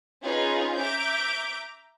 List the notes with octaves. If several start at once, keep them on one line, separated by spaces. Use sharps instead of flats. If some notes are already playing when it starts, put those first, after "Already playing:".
C#4 D#4 F4 G#4 B4 C#5
E5 A#5 D6 G6 D7